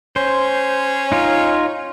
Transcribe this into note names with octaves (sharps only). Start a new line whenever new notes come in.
C#4 C5
D#4 F4